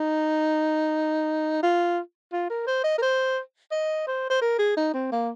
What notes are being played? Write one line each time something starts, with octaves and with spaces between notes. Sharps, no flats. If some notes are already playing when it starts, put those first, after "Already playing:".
Already playing: D#4
F4
F4
A#4
C5
D#5
A#4
C5
D#5
C5
C5
A#4
G#4
D#4
C4
A#3